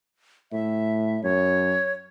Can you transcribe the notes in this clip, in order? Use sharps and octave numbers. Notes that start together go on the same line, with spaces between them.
A2 E5
F#2 C#5